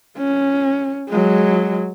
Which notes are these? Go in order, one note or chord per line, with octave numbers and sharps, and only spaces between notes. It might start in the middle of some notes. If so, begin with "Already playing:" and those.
C#4
F#3 G#3